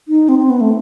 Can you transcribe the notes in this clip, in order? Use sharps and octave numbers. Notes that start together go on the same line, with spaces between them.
D#4
C4
C4
B3
A3